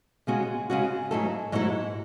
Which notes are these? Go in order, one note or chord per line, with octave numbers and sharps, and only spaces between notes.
C#3 G#3 C#4 F#4
C#3 G#3 C#4 F#4
G#2 F#3 A3 E4 A4
G#2 F#3 A3 E4 A4